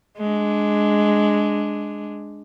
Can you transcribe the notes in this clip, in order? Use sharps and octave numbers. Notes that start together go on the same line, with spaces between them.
G#3 D4